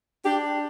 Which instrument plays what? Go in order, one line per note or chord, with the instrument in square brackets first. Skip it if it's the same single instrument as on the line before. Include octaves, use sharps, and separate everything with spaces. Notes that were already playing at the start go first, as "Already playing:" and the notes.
[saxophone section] D4 G4